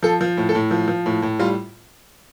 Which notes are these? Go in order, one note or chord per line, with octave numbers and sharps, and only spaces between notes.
F3 A4
F3
A2
A4
A2
F3
F3
A2
A2
G3 F4